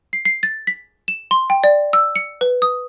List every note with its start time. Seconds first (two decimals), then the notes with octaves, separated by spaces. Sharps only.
0.13 C7
0.25 C7
0.43 A6
0.67 B6
1.08 E7
1.31 C6
1.50 G5
1.64 D5
1.93 E6
2.16 C#7
2.41 B4
2.62 D#6